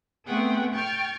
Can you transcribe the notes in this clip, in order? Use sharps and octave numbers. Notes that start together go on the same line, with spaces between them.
A3 B3 C4 G#4 F#5 G5
G5 C#6 F6 G6 A6